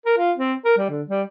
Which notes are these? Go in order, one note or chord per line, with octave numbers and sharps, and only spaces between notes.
A#4
F4
C4
A#4
G3
D3
G3